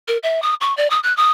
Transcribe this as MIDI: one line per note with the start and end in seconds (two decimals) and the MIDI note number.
0.08 0.18 70
0.23 0.42 76
0.42 0.55 87
0.61 0.75 85
0.77 0.89 74
0.90 1.00 87
1.03 1.15 90
1.17 1.32 87